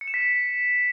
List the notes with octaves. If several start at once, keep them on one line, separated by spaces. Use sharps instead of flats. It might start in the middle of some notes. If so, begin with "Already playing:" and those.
C#7
E7
B6